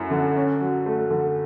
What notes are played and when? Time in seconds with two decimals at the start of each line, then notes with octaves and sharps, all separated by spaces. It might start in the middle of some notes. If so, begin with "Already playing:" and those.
Already playing: F#2 A3 E4
0.11 D3
0.36 C#4
0.60 F#3
0.86 A3
1.10 D3